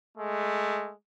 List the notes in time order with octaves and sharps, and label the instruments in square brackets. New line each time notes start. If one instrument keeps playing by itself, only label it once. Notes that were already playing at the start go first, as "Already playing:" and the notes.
[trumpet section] G#3 A3